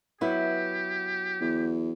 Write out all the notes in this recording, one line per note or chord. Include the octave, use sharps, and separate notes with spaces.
F#3 B3 E4 G4
E2